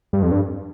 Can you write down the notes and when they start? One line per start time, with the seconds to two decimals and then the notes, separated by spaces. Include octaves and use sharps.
0.13 G2
0.23 F2
0.31 G2